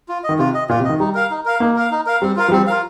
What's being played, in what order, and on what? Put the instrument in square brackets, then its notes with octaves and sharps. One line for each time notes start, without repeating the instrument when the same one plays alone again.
[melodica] F4
D#5
[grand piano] D#3
[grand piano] C3 [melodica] F4
[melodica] D#5
[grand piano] A#2 [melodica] F4
[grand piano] C3
[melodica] D#5
[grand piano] D#3
[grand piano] G3 [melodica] D#4
[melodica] A#4 F5
D#4
A#4 F5
[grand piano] A#3 [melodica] D#4
[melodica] A#4 F5
D#4
A#4 F5
[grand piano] G3 [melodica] C4
[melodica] F4 A#4 F5
[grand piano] F3
[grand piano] G3 [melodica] C4
[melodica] F4 A#4 F5